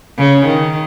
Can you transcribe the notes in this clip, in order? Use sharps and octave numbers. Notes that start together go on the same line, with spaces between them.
C#3
D#3